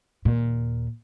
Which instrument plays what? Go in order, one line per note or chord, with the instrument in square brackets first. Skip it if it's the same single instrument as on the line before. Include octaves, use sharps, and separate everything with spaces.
[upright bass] D#2 A#2